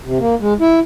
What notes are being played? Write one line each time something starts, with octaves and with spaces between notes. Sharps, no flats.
C3
A#3
G#3
E4